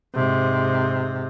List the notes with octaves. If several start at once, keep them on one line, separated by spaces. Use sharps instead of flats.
G#2 C3